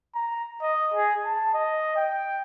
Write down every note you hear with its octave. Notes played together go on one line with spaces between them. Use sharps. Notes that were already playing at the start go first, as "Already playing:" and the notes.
A#5
D#5
G#4
A5
D#5
G5